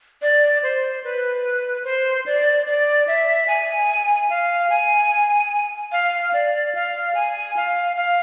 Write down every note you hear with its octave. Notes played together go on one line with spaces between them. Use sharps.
D5
C5
B4
C5
D5
D5
E5
G#5
F5
G#5
F5
D5
F5
G#5
F5
F5